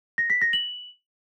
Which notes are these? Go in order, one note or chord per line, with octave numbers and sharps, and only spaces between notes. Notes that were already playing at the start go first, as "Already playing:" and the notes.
A#6
B6
A#6
F#7